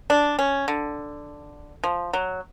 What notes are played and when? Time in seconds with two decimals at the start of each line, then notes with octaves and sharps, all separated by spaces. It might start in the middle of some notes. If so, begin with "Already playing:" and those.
0.10 D4
0.39 C#4
0.68 D3
1.84 F3
2.13 F#3